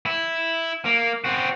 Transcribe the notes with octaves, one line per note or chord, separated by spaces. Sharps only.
E4
A#3
C4 F#4